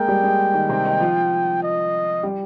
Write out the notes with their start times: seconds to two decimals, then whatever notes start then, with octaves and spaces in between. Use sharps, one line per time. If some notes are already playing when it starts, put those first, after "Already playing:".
Already playing: G#3 A#3 G#4 A#4 G5
0.08 G3 G4
0.23 G#3 G#4
0.54 D#3 D#4
0.69 C3 C4
0.85 D#3 D#4
1.00 F3 F4
1.63 D#5
2.23 G3 G4